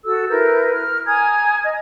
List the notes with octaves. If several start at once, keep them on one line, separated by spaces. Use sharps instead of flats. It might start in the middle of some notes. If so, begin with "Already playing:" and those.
F#4 A4 E6
E4 A#4 B4 G6
F6
G#5 A#5 D#6 G#6
D#5